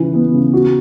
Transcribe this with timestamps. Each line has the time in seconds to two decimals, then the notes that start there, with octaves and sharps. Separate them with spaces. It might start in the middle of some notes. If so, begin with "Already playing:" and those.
Already playing: C#3 E3
0.14 B3
0.34 C#3
0.53 F#4